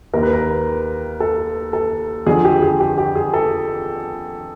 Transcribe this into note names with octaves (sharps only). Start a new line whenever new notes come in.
D#2 D#3 A#4
B4
A#4
A4
A4
F2 D3 F3 G#4
G4
G#4
G4
G4
G#4
A4